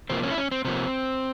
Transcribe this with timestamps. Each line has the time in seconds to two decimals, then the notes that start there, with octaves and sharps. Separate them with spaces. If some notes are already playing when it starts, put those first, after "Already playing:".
0.10 C3 F3 A#3 C4
0.23 C#4
0.31 E4
0.38 C#4
0.52 C4
0.65 C3 F3 A#3 C4